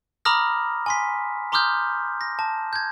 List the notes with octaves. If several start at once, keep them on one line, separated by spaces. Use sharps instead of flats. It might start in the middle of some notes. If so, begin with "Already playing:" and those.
A#5 B5 D6 D#6 F6 A#6
G#5 C6 B6
A#5 C6 D6 D#6 F6 G6
A#6
A5
G6 G#6